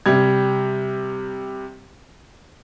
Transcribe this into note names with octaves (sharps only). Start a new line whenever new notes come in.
C3 G3 G#6